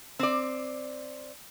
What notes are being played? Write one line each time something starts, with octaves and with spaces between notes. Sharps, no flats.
C4 D5